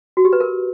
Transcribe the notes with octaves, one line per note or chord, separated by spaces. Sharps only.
F#4
G4
B4
A#4